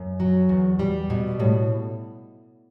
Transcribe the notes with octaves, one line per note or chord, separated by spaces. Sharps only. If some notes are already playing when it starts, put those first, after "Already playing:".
Already playing: F#2
F#3
E2
G3
B2
A2